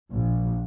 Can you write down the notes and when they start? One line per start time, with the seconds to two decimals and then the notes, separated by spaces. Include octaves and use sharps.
0.13 A#1